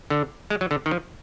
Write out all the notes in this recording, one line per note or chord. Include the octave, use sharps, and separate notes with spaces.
D3
G#3
F#3
D3
D#3
F3